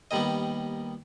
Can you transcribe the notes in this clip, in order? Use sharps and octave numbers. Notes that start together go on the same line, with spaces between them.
D#2 D#3 G3 B3 D#5